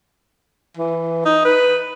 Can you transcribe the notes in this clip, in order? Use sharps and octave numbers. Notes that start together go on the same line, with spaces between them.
E3
D#4
B4